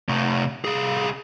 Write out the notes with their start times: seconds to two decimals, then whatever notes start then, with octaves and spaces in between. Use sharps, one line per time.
0.09 C3 A3
0.65 C2 G#4